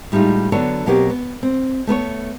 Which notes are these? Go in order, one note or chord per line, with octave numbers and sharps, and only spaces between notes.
A2 G3 G#3 D#4 F4
D3 F#3 B3 D4 A4 C#5
B2 F#3 A#3 C4 G4
B3
C4
A3 B3 B4 C#5